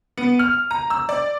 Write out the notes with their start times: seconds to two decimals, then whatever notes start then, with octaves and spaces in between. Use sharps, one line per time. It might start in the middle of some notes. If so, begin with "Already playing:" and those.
0.18 B3
0.39 F6
0.71 A#5
0.90 E6
1.09 D5